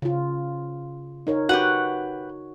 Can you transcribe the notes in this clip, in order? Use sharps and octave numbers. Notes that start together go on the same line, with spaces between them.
C#3 F4
D#4 A#4 C#5
F#4 G4 B4 F#5